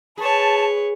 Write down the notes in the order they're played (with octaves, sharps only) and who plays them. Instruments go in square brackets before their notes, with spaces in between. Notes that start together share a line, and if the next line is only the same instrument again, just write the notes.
[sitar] G#4 [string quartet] B4 C#5 [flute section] A5